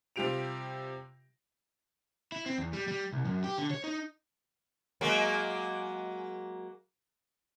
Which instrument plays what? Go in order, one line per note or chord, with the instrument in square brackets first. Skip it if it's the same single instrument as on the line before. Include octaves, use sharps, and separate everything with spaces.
[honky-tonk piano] C3 G3 F4 G4 D7 F7
[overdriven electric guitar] E4
C4
E2
G3
G3
C2
F#2
G4
D3
C#5
D#4
[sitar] F#3 G#3 A#3